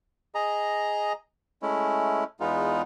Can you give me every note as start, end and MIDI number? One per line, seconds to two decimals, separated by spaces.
0.35 1.13 68
0.35 1.13 75
0.35 1.13 82
1.62 2.24 56
1.62 2.24 57
1.62 2.24 61
1.62 2.24 64
2.40 2.82 40
2.40 2.82 56
2.40 2.82 59
2.40 2.82 63
2.40 2.82 65